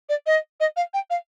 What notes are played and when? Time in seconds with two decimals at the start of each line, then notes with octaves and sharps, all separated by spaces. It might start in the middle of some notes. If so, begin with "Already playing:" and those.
0.09 D5
0.26 D#5
0.60 D#5
0.76 F5
0.94 G5
1.10 F5